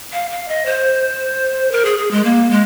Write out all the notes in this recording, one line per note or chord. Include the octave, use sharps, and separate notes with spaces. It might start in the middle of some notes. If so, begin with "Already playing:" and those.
F5
F5
D#5
C5
A#4
G#4
G#4
G#3
A#3
G#3